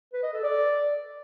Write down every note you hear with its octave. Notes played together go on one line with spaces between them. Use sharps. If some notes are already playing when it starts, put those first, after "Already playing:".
B4
D#5
A4
D5